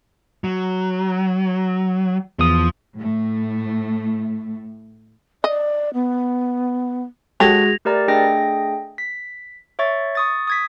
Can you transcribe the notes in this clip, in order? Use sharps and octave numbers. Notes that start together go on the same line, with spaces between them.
F#3
E2 F3 D#6
A2 A3
D5 D#5
B3
G#3 F#4 G4 A4 C#5 G#6 A#6 F7
A3 G4 A#4 D5 A#5 A6
A3 D4 G#4 D#5 G5 A#6
B6
C#5 E5 C#6 A6
C#6 D#6 A6
D#6 G#6 B6